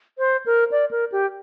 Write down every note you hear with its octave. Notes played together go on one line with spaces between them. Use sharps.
C5
A#4
D5
A#4
G4